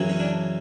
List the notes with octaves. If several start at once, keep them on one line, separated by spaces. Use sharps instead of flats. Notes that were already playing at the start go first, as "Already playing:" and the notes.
Already playing: F#2 C#3 E3
C#4
D4